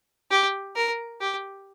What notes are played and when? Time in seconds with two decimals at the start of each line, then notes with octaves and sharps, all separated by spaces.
0.31 G4
0.76 A#4
1.21 G4